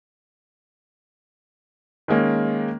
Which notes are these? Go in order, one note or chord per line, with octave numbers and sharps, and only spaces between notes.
D#3 G#3 A#3 C#4